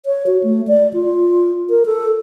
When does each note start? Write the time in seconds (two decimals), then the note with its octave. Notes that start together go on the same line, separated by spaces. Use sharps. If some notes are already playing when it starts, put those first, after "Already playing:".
0.06 C#5
0.27 F#4
0.44 A3
0.67 D5
0.94 F4
1.70 A#4
1.86 A4